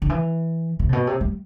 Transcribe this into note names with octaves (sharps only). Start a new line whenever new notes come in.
D3
E3
C3
A2
B2
C3
G3